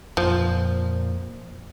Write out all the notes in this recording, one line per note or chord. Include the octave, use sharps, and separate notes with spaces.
F2 A#2 F3